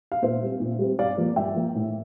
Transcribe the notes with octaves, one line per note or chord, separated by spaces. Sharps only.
F5
A#2 C5 E5
G3 C4
A#2
G3 C4
G2 D5 F5
F3 A#3
G2 E5 G5
F3 A#3
A2